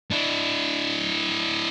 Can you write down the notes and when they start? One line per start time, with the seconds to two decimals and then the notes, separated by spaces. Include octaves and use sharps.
0.11 D4 E4